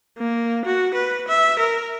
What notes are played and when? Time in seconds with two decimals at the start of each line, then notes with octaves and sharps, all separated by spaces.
0.18 A#3
0.65 F#4
0.94 B4
1.28 E5
1.59 A#4